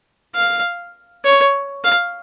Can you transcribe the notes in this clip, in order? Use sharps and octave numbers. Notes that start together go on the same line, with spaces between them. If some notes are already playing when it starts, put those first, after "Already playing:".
F5
C#5
F5